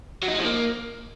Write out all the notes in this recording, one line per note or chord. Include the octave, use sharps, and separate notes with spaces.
F#3
D#4
G#3
F3
A#3